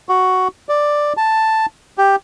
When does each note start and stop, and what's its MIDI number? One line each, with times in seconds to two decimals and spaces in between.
0.09 0.48 66
0.69 1.13 74
1.17 1.66 81
1.98 2.16 67